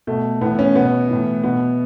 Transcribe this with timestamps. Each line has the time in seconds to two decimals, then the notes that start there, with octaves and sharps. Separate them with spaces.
0.07 B2 A3
0.41 A2 E3 B3
0.59 C#4
0.75 B2 B3
1.10 A2 E3
1.44 B2 B3